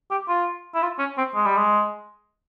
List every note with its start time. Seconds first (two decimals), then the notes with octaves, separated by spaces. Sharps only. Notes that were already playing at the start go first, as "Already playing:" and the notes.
0.11 G4
0.28 F4
0.74 E4
0.82 F4
0.99 C#4
1.18 C4
1.35 G#3
1.46 G3
1.57 G#3